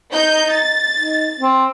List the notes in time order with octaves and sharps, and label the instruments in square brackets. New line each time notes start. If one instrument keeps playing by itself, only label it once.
[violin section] D#4 G6
A6
[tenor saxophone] D#4
C4